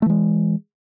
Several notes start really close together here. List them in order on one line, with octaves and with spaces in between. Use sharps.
A3 E3 G#3